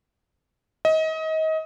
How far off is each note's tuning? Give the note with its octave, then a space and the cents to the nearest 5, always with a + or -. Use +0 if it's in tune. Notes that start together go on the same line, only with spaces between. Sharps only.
D#5 +30